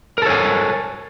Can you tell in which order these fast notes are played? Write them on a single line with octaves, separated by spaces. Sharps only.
A#4 A4 C#5 G#5